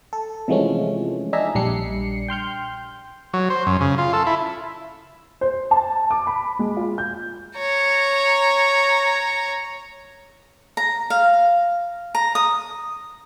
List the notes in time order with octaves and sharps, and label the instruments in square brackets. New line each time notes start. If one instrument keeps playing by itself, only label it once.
[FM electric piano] A4
C3 E3 F3 G#3 A3 C#4
D4 D#4 G#4 E5 A#5
A#1 G3 D4 C7 C#7
G5 C6 F6 G6
[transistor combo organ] F#3
C5
F#2
C#3
F4
A4
E4
[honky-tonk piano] C5
A5
D6
B5
G#3
F4
G6
[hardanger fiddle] C#5 A#5
[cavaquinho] A#5
F5
A#5
D#6